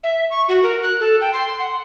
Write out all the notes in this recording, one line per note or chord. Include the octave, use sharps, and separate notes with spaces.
E5
C#6
F#4
A#4
F#6
A4
G5
C6
F#5